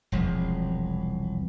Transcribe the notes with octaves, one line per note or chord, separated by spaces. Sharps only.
E1 C2 F3 G#3